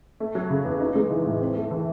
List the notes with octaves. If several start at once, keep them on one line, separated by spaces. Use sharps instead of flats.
A3
F#3
C#3
E2
D#4
G#3
E3
A2
C4
A3
E3